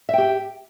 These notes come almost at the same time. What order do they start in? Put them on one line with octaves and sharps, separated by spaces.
E5 G5 G4